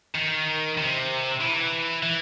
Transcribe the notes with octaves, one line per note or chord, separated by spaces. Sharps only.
D#3
C3
E3
E3